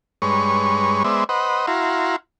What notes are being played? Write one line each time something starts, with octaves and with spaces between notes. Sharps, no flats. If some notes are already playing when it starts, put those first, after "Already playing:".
G2 G#3 B4 C#5 C#6
G#3 B3 C5 D5 E5
B4 C5 D#5 F#5
E4 F#4 F5 A#5 C6